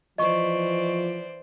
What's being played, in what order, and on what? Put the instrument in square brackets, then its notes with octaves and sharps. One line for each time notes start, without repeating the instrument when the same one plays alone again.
[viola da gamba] E3 C5 D5 [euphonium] F3 [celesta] D#5 C#6